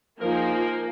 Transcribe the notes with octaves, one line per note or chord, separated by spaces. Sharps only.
F3 A#3 D#4 G#4 A#4